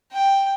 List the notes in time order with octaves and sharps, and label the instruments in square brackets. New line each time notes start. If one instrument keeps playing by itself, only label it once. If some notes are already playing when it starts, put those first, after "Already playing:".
[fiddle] G5